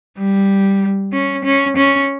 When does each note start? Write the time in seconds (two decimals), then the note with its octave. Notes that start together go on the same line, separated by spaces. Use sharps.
0.18 G3
1.13 C#4
1.44 C#4
1.77 C#4